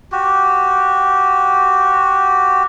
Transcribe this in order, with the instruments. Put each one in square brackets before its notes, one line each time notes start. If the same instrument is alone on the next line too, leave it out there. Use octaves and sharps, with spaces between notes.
[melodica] F#4 G4